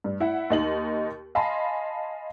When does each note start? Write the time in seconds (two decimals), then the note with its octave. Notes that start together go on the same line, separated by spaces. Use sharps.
0.04 G2
0.20 E4 E5 F#5
0.50 D#2 D#4 F#7
1.35 D#5 F5 G#5 A5 B5 C6